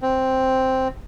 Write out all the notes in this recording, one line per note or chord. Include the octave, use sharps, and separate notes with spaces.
C4